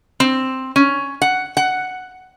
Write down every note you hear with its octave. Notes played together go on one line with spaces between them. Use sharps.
C4
C#4
F#5
F#5